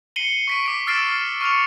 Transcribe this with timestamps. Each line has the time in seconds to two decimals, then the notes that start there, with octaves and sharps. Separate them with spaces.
0.16 C7 C#7 D#7 F#7 G7
0.48 C#6 B6 D7
0.65 D6 B6 D7
0.87 E6 F6 A6 C7 D7 E7
1.41 C#6 F6 C#7 F7